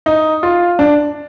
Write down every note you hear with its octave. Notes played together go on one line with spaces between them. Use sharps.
D#4
F4
D4